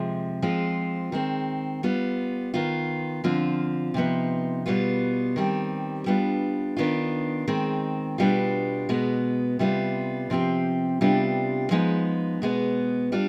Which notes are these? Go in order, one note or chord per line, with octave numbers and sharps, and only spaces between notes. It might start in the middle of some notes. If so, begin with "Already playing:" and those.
Already playing: C3 F3 G#3
F3 G#3 C4 F4
D#3 G#3 C4
G3 B3 F4
D#3 B3 F4
D3 F3 C4 F4
C3 F3 B3 D#4
B2 G3 B3 F4
D#3 G3 C4 G4
G3 B3 D4 F4
D#3 B3 D4 F4
D#3 G#3 C4
B2 G3 B3 D4 F4
B2 G#3 B3
C3 G3 B3 F4
C3 F3 C4 G4
C3 G3 B3 D4 F4
F3 G#3 B3 D#4
B2 G#3 B3
G3 D4 F4